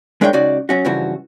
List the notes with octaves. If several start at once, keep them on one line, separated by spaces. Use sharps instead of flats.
G#3 D4 A#4 C#5 D#5 G5
C#2 C#4 D#4 F#4 D5
F#3 C#4 F#4
G2 C#3 E3 F3 F#4